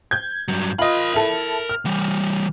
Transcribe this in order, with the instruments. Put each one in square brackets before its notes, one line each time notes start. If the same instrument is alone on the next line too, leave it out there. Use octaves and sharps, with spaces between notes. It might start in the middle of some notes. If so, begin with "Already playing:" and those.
[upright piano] G6 G#6
[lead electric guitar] G2 F#3
[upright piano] F4 D#5 [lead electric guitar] A#4 B5
[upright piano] E4 A4
F6
[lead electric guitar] E3 G3